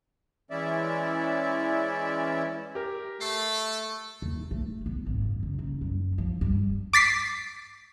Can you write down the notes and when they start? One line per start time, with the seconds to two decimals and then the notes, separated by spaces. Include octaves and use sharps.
0.51 E3 G#3 C#4 E4 D5 E5
2.75 G4 A#4
3.21 A3 A4 C7
4.22 D#2
4.51 A3
4.86 B3
5.06 G#1
5.25 F#2
5.43 C#2
5.59 F#1
5.81 F#2
6.18 F3
6.41 G2
6.93 D6 A6 B6 C7